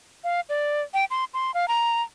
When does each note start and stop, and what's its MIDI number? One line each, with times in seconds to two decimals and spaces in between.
0.24 0.40 77
0.49 0.82 74
0.94 1.05 79
1.11 1.25 84
1.34 1.54 84
1.54 1.68 77
1.68 2.02 82